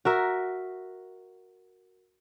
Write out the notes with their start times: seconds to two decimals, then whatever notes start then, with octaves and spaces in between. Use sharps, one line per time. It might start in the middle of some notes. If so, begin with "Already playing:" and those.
0.05 F#4 A#4 E5